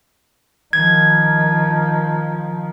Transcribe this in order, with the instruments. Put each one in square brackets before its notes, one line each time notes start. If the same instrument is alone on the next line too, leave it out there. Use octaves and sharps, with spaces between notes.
[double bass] D#3 F3 [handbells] G#6